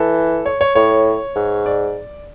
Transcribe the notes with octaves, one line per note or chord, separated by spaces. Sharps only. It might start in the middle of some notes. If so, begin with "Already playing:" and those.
Already playing: E3 A4
C#5
C#5
A2 C#5
G#2
D5